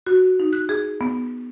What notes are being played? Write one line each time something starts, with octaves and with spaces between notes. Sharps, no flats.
F#4
D#4
F#6
G#4
B3